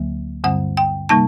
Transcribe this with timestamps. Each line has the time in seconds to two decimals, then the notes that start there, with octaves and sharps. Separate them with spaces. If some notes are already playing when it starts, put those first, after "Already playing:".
Already playing: D2 D3 F#3 A#3
0.44 G2 D3 G3 C4 F#5
0.77 G5
1.09 C3 G3 A#3 D#4 A5